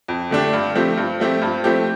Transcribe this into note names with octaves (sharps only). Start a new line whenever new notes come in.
F2
D3 A3 D4 G4
G2
F3 A3 C4 G4
G2
F3 A3 C4 G4
G2
F3 A3 C4 G4